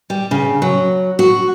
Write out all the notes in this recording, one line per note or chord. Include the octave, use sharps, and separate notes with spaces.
G3
C#3
F#3
F#4